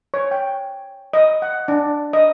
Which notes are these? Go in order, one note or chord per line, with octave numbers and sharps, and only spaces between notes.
C#5
G5
D#5
F#5
D4
D#5